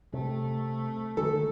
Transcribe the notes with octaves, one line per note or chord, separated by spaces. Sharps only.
C3 A3
D3 D#3 G#3 A4